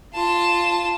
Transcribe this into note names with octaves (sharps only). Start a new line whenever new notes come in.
F4 A5